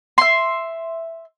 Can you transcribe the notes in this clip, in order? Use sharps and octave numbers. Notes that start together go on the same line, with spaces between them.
E5 C6